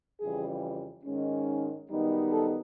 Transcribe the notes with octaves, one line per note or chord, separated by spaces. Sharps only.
F2 C#3 E3 G3 G#4
G#2 D#3 G#3 C#4
F#2 D#3 G3 B3 D#4
A4